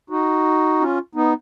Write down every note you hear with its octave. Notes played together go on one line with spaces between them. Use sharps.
D#4 F#4
C#4 F4
B3 D#4